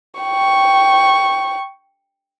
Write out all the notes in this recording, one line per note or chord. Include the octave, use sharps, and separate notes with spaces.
G5 C#6